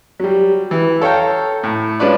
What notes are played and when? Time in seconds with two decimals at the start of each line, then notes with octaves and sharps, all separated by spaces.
0.20 F#3 G3
0.71 E3
1.01 A4 C#5 F5 G5 A#5
1.63 A2
1.99 G#3 C#4 D4 F4 B4 D5